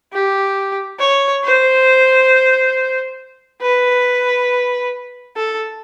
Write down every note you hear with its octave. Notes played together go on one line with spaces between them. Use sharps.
G4
C#5
C5
B4
A4